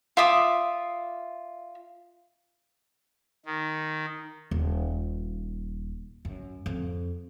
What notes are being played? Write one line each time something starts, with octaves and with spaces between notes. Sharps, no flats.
F4 E5 D6 D#6
D#3
D#1
F#2
F2